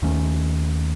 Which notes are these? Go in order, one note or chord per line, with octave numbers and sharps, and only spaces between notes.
D#2 D#3 A3 C#4